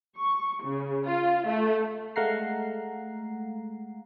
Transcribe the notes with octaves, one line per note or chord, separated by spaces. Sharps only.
C#6
C#3
F4
A3
G#3 A3 F5 F#5 A#5 C7